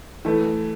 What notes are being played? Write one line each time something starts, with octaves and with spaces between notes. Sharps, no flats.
E3 A3